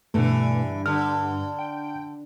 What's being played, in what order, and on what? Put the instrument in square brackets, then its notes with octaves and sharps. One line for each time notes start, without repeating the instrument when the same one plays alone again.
[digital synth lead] G2 [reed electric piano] B2 A3 [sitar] D3 E3
[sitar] D3 [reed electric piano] F6
[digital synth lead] G5